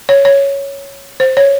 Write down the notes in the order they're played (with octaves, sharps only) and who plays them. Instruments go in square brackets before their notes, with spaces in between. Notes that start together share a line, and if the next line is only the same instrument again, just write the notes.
[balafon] C#5
C#5
C5
C#5